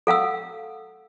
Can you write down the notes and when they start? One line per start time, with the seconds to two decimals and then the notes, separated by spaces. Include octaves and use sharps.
0.07 A4 F5 F#5 E6